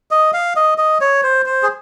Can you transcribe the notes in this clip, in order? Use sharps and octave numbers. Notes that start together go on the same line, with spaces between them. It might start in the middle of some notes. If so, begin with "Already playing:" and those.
D#5
F5
D#5
D#5
C#5
C5
C5
G#4